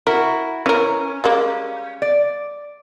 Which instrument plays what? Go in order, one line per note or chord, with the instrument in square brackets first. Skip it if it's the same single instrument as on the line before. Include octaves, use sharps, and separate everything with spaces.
[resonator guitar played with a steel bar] E4 F#4 [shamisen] A#4
[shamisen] E3 A#4 [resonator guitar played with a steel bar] C#4
[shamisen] G3 G#3 A#3
[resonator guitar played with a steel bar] D5